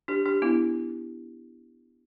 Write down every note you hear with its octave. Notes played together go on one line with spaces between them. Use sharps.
D4 G4
D4 G4
B3 E4